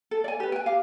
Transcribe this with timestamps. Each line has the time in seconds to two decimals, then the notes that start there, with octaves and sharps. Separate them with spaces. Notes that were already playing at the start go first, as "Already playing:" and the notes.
0.11 A4
0.24 D5 G#5
0.40 G4 B4
0.52 G5 G#5
0.66 G4 F5